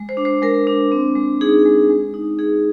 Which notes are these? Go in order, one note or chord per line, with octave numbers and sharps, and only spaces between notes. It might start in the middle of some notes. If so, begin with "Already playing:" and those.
Already playing: G#3
C5
D4
C5
G#3 A#4
D4
C4
G#3
D#4 G#4
G#3
G#3
D#4
D#4 G#4